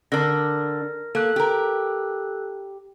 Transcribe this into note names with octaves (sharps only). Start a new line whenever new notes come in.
D3 D4 A#4 A#6
A#3 A4 F#6
G4 A#4